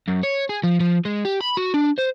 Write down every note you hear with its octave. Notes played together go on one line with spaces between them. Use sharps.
F#2
C#5
G#4
F3
F3
G#3
G4
B5
F#4
D4
C5